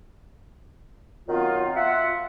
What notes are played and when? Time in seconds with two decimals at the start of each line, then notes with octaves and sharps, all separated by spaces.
1.27 D#3 F#3 B3 C4 F4
1.74 F4 E5 F#5